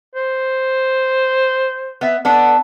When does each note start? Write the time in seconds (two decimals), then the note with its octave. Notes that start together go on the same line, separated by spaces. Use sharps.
0.15 C5
2.01 B3 E5
2.25 B3 D4 A4 F#5